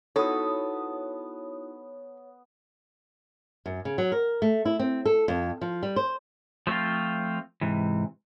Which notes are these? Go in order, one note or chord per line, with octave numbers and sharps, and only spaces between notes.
B3 D#4 E4 F#4 A4 C#5 B5 D#6
F#2
C#3
F#3
A#4
A3
E4
C4
A4
F2
F3
G3
C5
F3 A3 B3 C4 F4
G#2 C3 E3